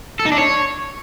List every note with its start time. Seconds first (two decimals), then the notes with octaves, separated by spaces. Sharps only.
0.20 A4
0.26 D#4
0.32 D4
0.38 C#5